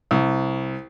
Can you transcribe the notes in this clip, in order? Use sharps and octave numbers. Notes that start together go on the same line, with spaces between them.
C2